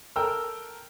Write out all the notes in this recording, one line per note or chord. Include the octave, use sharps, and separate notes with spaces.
A4 A#4 G5 A#5 E6 F6